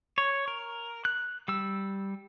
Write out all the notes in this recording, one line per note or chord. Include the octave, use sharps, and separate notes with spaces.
C#5
A#4
F#6
G3 E6